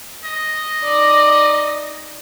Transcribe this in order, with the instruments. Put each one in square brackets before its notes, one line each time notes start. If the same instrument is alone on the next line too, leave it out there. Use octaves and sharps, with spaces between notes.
[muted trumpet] D#5
[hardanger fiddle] D#4 D5